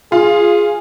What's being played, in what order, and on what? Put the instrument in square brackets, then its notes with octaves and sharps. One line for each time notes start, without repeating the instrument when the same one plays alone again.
[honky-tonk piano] F4 [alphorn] G#4